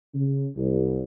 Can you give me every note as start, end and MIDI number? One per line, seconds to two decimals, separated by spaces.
0.15 0.47 49
0.57 1.03 36